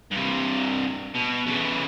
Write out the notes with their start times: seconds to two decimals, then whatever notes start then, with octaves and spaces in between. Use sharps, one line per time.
0.11 G2 C3
1.15 B2
1.47 C#3 E3